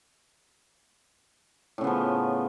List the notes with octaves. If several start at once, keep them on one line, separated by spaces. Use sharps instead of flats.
A2 C#3 F3 B3